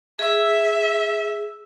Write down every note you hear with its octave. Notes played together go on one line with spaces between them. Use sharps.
G#4 E5 E6